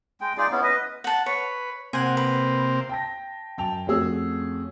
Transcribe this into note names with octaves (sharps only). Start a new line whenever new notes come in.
G#3 G5
D#4 F4 G#4 D5
B3 C#4 E4
B4 D#5
F#5 A5
B4 C#5
C3 A#3 C4 F#5 G#5
B4
G5 A5 A#6
F#2 G5 A5 F7
F2 A3 C#4 F#4 G#4 E6